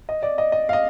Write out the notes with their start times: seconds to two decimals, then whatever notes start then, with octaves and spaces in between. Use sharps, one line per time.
0.09 D#5
0.23 D5
0.38 D#5
0.52 D#5
0.69 F5
0.73 D#5